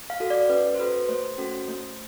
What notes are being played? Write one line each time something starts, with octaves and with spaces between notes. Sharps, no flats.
F5
F#4 A4
D5
C#4 B4
C5
F#4 A4 B4
A3 C5
C#4 F#4 A4
A3